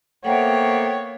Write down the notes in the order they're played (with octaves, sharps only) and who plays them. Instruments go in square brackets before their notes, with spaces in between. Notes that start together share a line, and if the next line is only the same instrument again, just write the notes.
[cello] A#3 B3 [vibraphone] A4 C5 E5 [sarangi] C#5 [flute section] F#5 G5